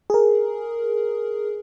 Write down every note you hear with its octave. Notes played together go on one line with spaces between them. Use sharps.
G#4 A#4